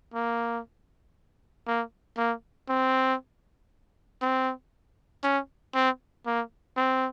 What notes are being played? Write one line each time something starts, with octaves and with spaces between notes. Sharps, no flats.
A#3
A#3
A#3
C4
C4
C#4
C4
A#3
C4